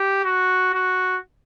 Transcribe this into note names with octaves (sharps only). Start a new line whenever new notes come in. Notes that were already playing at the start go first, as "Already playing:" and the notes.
Already playing: G4
F#4
F#4